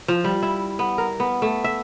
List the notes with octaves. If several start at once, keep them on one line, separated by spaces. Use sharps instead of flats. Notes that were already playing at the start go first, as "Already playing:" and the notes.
F3
G3
E4
B3
A#4
B3
A3
E5